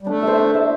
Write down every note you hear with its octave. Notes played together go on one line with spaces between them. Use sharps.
G3
A3 D4
C5 E5
D4
C5 E5